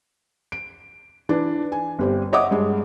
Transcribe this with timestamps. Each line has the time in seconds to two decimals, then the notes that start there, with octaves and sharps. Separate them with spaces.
0.52 D7
1.29 E3 D4
1.72 G#5
1.99 G1 G3 C4
2.33 C#5 D#5 E5 F#5 D6 D#6
2.51 G2 G#3